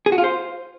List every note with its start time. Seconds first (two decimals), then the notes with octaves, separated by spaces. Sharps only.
0.06 G#4
0.12 F#4
0.18 F4
0.24 C5